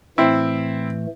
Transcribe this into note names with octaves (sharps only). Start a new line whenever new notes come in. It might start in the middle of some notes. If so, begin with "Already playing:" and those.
A2 E3 A3 C4 E4